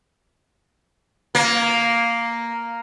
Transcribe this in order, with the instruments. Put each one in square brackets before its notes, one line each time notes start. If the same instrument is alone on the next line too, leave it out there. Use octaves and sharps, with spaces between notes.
[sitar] A#3